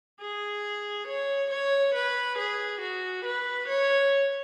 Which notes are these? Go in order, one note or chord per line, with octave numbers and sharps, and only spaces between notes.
G#4
C#5
C#5
B4
G#4
F#4
B4
C#5